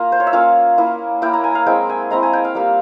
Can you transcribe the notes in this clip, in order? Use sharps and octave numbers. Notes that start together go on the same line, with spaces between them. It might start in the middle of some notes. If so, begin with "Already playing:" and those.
Already playing: A#3 F4 A#5
C5
C#5
E5
A#3 C#4 F4 F5
A#3 E4
A#3 E4 G5
A#5
G#5
F5
G#3 C4 E4 G5
G#5
G#3 C4 E4 A#5
G#5
G5
F5
G3 A#3 F4 F5